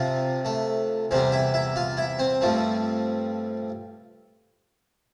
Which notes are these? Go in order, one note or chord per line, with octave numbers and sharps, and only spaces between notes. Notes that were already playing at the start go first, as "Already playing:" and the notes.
Already playing: C3 F3 C4 F4
A3 A4
E2 C3 G3 C4 C5
E4 E5
E4 E5
F4 F5
E4 E5
C4 C5
G2 F3 A3 C4